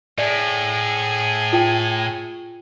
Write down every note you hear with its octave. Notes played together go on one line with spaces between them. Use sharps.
A2 G#4 D5
F4 G5